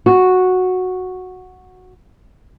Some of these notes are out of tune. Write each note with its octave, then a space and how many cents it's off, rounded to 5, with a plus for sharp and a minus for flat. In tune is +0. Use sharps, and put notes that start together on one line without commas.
F#4 -5